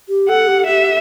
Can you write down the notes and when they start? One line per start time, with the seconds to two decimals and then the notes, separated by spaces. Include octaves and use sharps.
0.09 G4
0.29 A4 F#5
0.48 G4
0.67 G4 E5